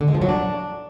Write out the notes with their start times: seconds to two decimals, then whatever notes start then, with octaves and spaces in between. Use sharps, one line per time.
0.01 D3
0.08 G#3
0.15 F3
0.22 F#3
0.28 D4